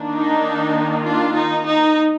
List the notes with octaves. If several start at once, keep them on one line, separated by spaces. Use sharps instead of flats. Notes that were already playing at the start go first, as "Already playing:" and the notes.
Already playing: D#3 A#3 D4
D#4
D4 F4
D#4
D#4